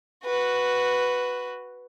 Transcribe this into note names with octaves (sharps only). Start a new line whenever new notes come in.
F#4 B4